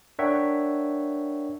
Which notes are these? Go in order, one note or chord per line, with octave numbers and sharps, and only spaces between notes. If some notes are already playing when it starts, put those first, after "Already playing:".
D4 A#4 C#5 E5 F#5 G5